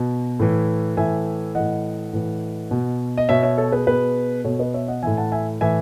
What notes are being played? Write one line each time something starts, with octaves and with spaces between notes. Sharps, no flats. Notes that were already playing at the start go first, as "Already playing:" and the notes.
Already playing: B2
A2 E3
A2 E3 E5 G#5
A2 E3 D#5 F#5
A2 E3
B2
D#5
B2 C#5 E5
C#5 E5
A4 C#5
G#4 B4
B2 G#4 B4
B2 A4 C#5
B4 D#5
C#5 E5
D#5 F#5
A2 E3 E5 G#5
F#5 A5
E5 G#5
A2 E3 E5 G#5